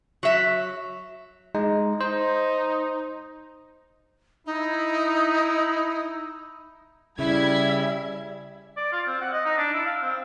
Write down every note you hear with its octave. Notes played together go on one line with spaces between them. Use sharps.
F#3 E5
G#3 D#4
D#4 C5
D#4 E4
C#3 G3 E4 E5 G#6
D5
F4
C4
F#5
D#5
D#4
D4
E4
F5
C4